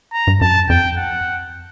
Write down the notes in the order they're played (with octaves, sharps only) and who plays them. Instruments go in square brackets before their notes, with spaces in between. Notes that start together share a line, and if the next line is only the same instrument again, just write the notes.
[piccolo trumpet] A#5
[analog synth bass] G2
[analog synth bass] F#2 [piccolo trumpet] A5
[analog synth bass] F2 [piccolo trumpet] G5
[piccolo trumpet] F#5